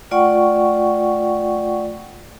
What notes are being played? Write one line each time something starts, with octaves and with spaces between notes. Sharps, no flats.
A3 F4 D5 F#5 G5 C#6